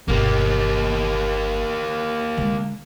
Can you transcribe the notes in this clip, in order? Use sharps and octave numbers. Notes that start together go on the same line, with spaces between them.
G1 B2 A#3 G4
D3 G#3